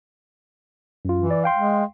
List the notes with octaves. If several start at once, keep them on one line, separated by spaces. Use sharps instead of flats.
F#2 F4
E3
D5
F5 G5 C6
G#3